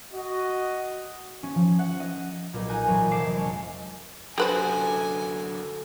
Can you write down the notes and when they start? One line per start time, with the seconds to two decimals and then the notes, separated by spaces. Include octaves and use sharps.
0.13 F#4 D#5
1.43 C#4
1.55 F3
1.79 F#5
2.00 D#5
2.53 B1 A#2
2.69 D#4 G#5 F#6
2.87 F2 A#2 E3 F#3
3.11 F1 A5 D6 C7
3.36 G#3 C#4 D4
4.38 F#2 D3 F#4 G4 A4 B4 C5 G#5